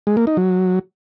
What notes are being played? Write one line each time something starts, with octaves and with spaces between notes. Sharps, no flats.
G#3
A#3
D#4
F#3